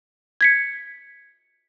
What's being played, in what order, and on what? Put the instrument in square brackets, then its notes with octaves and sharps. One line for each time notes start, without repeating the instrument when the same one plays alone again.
[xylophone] G#6 B6 C#7